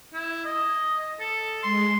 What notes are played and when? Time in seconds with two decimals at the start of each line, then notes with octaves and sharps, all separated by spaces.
0.14 E4
0.45 D#5
1.20 A4
1.63 G#3 C6